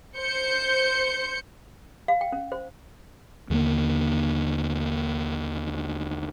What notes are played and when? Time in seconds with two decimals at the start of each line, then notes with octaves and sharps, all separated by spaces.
0.17 C5 G6 C#7
2.08 F5
2.21 G5
2.32 C#4
2.52 C5
3.50 D#2 D3 F3 A#3